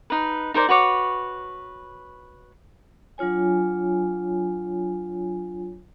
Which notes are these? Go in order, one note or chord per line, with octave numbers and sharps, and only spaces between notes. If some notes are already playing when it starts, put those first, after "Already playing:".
D#4 B4
D#4 A#4 C5 D5
F#4 B4 C#5 D6
F#3 D4 F4 C#5 G#5